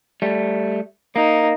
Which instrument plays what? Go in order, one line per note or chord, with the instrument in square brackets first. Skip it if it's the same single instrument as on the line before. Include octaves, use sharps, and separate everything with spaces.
[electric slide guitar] G3 A3
[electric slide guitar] A#3 [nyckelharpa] D#4